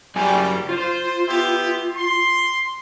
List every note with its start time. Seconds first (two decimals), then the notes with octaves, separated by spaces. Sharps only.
0.16 F#2 G3 G#4 G#5
0.69 F4 C5
1.28 B3 E4 G4
1.96 C6